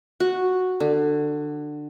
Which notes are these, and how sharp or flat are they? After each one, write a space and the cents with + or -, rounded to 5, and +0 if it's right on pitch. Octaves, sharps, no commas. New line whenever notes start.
F#4 -5
D3 +20